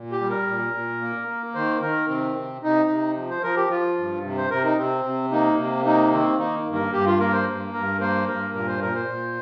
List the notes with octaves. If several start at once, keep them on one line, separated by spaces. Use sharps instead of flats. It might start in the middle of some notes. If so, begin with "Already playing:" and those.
Already playing: A#2
G4
G3
A#4
A#2
A#2
A#3
A#3
D#3 C5
D#3 A#4
C3 C4
C3
C3 D#4
C3
F3
C5
F3 A#4
G4
F3 F4
G2
C3
C5
C3 A#4
D#4
C3 C4
C3
A#3 D#4
C3
A#3 D#4
D#3 C4
A#3 D#4
G2
A#4
G2 G4
F4
A#3 A#4
C5
G2
G2 A#4
A#3 C5
G2 A#4
A#2 A#4
C5
A#2 A#4
C5
A#2